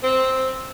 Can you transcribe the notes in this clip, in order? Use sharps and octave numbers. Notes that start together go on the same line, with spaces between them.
C4